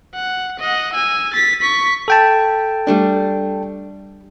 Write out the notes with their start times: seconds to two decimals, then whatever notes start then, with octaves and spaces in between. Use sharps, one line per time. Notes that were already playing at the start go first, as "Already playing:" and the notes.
0.15 F#5
0.59 D#5 F#5
0.93 G#5 E6
1.34 A6 B6
1.62 C#6 B6
2.08 A4 G5 A5
2.87 G3 A3 D4